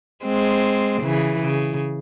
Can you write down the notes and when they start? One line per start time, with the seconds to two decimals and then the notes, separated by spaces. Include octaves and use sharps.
0.24 G#3 C4
1.02 C#3 E3
1.42 C#3